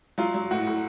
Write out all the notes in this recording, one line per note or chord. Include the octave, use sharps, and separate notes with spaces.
F#3 F4
F#3
A2 F#4
A2